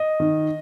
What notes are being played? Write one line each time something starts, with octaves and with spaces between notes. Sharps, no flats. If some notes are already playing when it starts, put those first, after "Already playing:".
Already playing: D#5
D#3